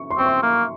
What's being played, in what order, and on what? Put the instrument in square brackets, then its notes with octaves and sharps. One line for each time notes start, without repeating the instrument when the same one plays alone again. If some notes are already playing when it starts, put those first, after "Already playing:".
Already playing: [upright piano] C#6
C6
[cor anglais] C4 [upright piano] C#6
[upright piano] C6
[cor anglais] A#3